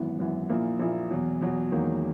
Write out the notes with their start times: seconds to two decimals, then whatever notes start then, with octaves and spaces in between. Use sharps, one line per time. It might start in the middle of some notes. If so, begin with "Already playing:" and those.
Already playing: G#1 F#2 E3 B3 E4
0.19 G#1 F#2 E3 B3 E4
0.49 A#1 A#2 A#3 E4
0.80 A#1 A#2 A#3 E4
1.11 E2 B2 F#3
1.41 E2 B2 F#3
1.71 E1 E2 D#3 F#3 A#3